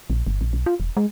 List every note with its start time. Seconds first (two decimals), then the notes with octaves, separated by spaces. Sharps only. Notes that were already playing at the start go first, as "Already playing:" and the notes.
0.10 A#1
0.27 G1
0.41 A#1
0.53 B1
0.66 F4
0.80 E1
0.97 G#3